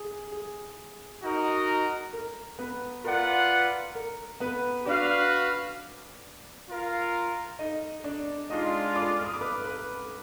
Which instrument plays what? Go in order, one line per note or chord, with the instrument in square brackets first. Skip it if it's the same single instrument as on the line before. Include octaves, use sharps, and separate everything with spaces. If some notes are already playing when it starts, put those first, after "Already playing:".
Already playing: [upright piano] G#4
G#4
[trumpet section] D#4 F#4 A#4 D#5
[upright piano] A#4
B3 B4
[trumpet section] F4 B4 D5 F#5 [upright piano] A#4
[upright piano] A#4
B3 B4
[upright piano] D4 D5 [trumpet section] F#4 B4 F5
[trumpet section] F4 A#4 F5
[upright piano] D#4 D#5
D4 D5
[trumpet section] G#3 D4 F4 [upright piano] D#4 D#5
[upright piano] D5 D6
F6
D#6
D6
B4 B5
B4 B5